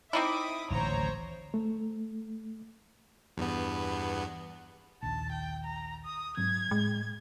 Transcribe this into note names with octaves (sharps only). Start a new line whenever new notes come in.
C4 D#4 E4 E5 D6 D#6
D1 A1 D#2 C5 C#5 A#5
A3
E2 G2 B3
A#1 D#2 A5
G5
A#5
D#6
G#2 F#3 C4 G#6
A2 G#3